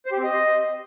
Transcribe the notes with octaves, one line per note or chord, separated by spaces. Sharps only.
C5
G4
C4
D#5